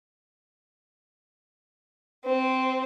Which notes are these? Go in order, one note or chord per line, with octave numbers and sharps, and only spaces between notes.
C4